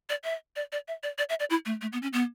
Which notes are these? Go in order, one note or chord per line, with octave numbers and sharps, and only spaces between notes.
D5
E5
D5
D5
E5
D5
D5
E5
D5
E4
A3
A3
B3
C#4
B3